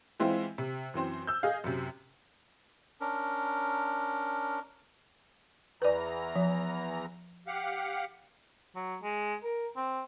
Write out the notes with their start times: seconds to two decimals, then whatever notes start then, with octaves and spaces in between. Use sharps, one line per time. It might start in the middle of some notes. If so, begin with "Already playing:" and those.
0.20 E3 G#3 C4 E4 F4
0.58 C3
0.94 F#2 E3 C4 C5
1.27 E6 G6
1.43 G#4 D#5 F5
1.64 F#2 C3
3.00 C#4 D4 A#4
5.82 E2 E3 B4 D5 A#5
6.36 F3
7.47 G4 F5 F#5
8.76 F#3
9.03 G#3
9.43 A#4
9.76 C4